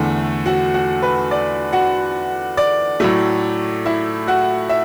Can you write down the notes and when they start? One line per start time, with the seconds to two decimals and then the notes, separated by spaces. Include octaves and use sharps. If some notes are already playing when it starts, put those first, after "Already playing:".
Already playing: E2 D3 A3
0.46 F#4 F#5
0.74 F#4 F#5
1.02 B4
1.31 D5
1.73 F#4 F#5
2.57 D5
3.00 A2 F#3 A3
3.85 E4 E5
4.27 F#4 F#5
4.69 E5